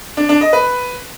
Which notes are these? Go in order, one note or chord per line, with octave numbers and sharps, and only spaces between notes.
D4
D4
D#5
B4